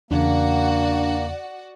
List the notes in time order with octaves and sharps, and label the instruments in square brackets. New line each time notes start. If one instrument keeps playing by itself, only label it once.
[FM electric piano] E2 C#3 [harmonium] A#3 [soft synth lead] D4 [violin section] F#4 D5 F#5